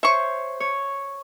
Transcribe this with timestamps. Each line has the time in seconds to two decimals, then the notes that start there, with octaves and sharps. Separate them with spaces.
0.03 C5 C#5 E5 C#6
0.60 C#5